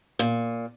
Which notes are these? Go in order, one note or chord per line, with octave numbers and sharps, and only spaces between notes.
A#2